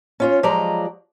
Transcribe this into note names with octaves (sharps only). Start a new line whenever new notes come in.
C#4 F4 C#5
F3 F#3 G#3 D5 D#5 A#5